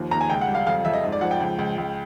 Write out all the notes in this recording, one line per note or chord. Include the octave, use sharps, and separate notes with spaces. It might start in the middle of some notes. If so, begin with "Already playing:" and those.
Already playing: D#2 F3
D#2 A#5
G#5
C#2 G5
F#5
G3
F5
F2 F5
F2 E5
D#5
G#2
D5
F3 F#5
G5
C#2
C#2
C#2